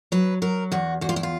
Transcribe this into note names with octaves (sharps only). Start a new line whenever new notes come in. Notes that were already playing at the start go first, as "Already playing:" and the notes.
F#3 B4
F#3 A#4
E2 F#4
E2 F#4
F4
E4
F4